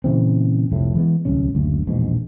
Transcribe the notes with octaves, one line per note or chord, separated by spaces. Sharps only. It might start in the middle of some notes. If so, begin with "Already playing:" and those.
A#2 C#3 E3 C4
F1 C2 F2 A2
E3 G#3 B3
D1 C2 C#4
F#1 D2
E1 A#1 G#2 B2